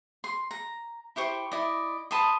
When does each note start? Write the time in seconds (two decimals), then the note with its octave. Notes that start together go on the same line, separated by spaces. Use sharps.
0.24 C6
0.51 A#5
1.16 E4 G4 C5 C#6
1.52 E4 D5 D#5
2.11 B4 A5 C6 D#6